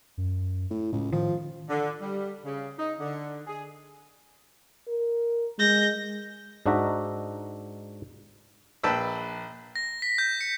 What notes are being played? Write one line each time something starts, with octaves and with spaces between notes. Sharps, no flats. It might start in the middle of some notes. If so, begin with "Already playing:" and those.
F#2
A2
C#2 A2
D#3 F3
D3
G3
C#3
D#4
D3
G#4
A#4
G#3 G6 A#6
G#2 D4 D#4 F#4 E5 A#5
A#1 B4 G5 A5 B5 E6
A#6
B6
G6
C#7